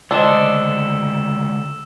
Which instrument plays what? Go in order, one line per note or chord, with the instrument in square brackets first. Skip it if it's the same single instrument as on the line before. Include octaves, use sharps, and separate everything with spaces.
[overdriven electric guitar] C#2 D3 [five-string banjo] D4 C5 D#5 [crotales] E6 E7